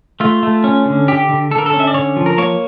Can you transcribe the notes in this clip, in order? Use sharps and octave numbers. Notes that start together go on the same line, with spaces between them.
A3 F4
A3
C#4
D3
D3 G4
D3
D3 A4
A#4
A4
C#4
E5
D5
D3 C#5
F3
A#4
A#3 C#5